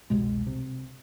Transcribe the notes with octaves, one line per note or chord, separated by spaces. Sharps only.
F1 C2 B2 G#3
C3